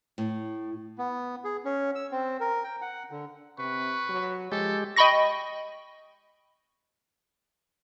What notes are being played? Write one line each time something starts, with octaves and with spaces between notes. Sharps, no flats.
A2
B3
G#4
C#4
E6
C4
A#4
G5
F#5
D3
C3 B4 C#6
F#3
F3 G#3 G4 A4
D#5 G5 B5 C#6 A#6